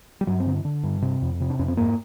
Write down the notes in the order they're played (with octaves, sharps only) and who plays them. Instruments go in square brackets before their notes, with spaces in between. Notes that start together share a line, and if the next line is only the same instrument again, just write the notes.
[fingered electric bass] G3
G2 F#3
C4
D3
D3
G2
C3
F2
C3
D4
F2 C#4
C4
G#2 A#3